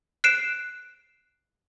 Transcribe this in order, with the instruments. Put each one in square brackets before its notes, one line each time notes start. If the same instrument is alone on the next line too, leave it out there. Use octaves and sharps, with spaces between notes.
[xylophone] F#6 C7 D7 E7